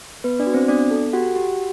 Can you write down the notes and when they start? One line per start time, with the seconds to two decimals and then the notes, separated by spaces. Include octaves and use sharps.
0.24 B3 B4
0.39 D4 D5
0.47 F#4
0.54 C4 C5
0.68 B3 D4 D5
0.91 A4
1.13 F#4 G4 F#5
1.36 G4